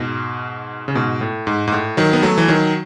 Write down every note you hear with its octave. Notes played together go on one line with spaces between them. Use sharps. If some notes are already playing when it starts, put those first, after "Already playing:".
Already playing: G#2 B2
C#3
G#2 B2
A2
G#2
G#2
A2
D#3 F#3
B3
F#3 A3
E3
D#3 F#3